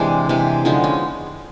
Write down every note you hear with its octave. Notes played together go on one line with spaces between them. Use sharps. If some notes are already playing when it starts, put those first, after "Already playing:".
Already playing: C3 E3 G#3 D4
C3 E3 G#3
D3 F3 G#3 B3 D#4
C#4